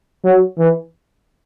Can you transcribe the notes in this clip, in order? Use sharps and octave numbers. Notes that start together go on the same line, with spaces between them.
F#3
E3